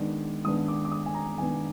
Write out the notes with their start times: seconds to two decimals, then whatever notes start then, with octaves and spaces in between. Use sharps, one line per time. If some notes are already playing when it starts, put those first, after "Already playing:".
Already playing: D#3 G#3 B3 D4
0.44 D#3 G#3 B3 D4 D#6
0.68 D6
0.85 D6
0.92 D#6
1.06 G#5
1.14 A#5
1.38 D#3 G#3 B3 D4 G#5